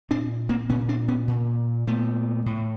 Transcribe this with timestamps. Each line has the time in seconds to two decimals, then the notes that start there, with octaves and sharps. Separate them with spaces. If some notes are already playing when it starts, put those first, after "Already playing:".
0.10 A#2 C4 D4
0.49 A#3 C4
0.69 A#2 B3 C#4
0.89 C4 D4
1.08 B3 C#4
1.28 A#2
1.87 A#2 A3 B3
2.46 A2